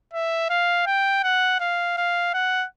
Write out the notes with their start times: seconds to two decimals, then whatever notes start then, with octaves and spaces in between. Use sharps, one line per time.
0.13 E5
0.50 F5
0.87 G5
1.24 F#5
1.60 F5
1.97 F5
2.34 F#5